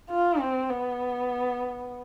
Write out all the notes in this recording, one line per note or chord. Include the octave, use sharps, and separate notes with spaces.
F4
C4
B3